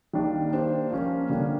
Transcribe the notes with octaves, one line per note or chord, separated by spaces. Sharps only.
D#3 G3 A#3 D4
A#3 D4 G4 C5
F3 A#3 C#4
D3 G3 A#3 D4